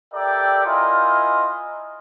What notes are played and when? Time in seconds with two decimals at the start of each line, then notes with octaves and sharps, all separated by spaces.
0.13 G4 A4 A#4 D5 E5 G5
0.65 E4 F4 A#4 D#5 F5 G#5